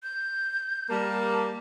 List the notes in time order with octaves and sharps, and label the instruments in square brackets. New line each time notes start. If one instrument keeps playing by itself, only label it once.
[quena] G6
[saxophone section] G3 A#3 [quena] A5